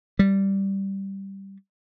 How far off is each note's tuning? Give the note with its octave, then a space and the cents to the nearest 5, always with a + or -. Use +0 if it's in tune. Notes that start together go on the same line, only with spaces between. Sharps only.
G3 -5